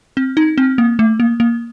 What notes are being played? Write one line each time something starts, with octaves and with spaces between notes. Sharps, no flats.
C4
D#4
C4
A#3
A3
A#3
A#3